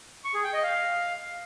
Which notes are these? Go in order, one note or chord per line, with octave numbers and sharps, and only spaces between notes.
C#6
G#4
G5
D#5
F5